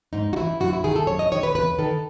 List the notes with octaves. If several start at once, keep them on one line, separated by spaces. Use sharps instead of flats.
G#2 D#4
F#4
E3 E4
F#2 F#4
E4
D#3 G#4
A4
F#2 C#5
D#5
D#3 C#5
B4
E2 B4
D#3 A4